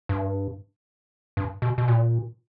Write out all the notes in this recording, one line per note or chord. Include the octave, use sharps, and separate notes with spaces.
G2
G2
B2
B2
A#2